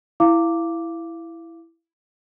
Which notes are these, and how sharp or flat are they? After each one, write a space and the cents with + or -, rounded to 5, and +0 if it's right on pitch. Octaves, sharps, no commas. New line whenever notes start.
E4 +5 F5 -15 D6 +0